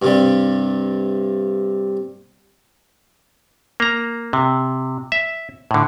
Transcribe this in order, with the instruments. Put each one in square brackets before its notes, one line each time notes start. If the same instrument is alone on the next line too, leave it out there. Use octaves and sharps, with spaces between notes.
[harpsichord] G2 C3 G3
[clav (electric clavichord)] A#3 A#5
C3
E5
A2 D3